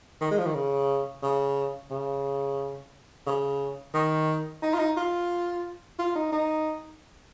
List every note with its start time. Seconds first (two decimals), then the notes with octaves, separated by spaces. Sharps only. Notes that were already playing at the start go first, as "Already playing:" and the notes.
0.21 D#3
0.31 G#3
0.39 F3
0.46 D#3
0.55 C#3
1.23 C#3
1.91 C#3
3.27 C#3
3.94 D#3
4.62 D#4
4.74 F4
4.79 D#4
4.97 F4
5.99 F4
6.16 D#4
6.32 D#4